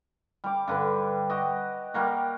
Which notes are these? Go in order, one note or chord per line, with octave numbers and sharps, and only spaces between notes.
G3 D6
G2 D3 B4
F#4 G4 D#5
G3 A#3 F#4